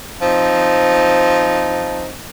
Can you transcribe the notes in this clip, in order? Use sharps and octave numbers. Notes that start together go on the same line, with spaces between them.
F3 C4 D#4